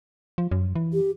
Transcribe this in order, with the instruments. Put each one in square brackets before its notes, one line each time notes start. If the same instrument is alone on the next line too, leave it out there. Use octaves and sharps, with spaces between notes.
[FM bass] F3
F#2
E3
[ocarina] G4